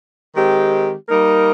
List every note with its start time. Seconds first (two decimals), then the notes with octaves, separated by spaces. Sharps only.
0.34 D#3 G#3 C4 G4
1.09 G3 A#3 D#4 A#4